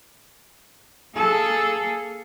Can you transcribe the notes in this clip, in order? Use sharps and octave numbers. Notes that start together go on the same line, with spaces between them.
A#3 G#4 A4